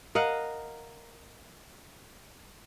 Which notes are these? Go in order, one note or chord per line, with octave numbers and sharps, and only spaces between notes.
A#4 D#5 F5 F#5